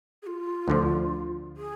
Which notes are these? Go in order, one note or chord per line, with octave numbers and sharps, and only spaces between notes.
G#4
F4
D2 D3 F3
G#4